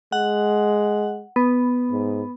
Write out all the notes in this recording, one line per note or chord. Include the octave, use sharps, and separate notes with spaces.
G#3 F#5
B3
G#2